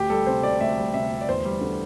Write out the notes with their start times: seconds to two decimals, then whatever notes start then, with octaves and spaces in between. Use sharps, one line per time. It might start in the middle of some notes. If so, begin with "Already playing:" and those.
Already playing: D2 G4
0.10 G3 A4
0.27 C3 C5
0.43 D2 D5
0.61 D2 E5
0.78 G3
0.94 C3 E5
1.11 D2
1.21 D5
1.29 E2 C5
1.45 G3
1.61 D3